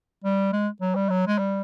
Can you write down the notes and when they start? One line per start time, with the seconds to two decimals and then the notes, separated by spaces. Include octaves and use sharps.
0.24 G3
0.53 G#3
0.81 F#3
0.95 G3
1.10 F#3
1.27 G#3
1.38 G3